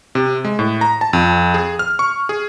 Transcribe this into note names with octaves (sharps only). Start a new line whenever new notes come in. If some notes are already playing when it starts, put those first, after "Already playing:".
C3
G#3
A2
A#5
A5
F2
G#4
F6
C#6
G#4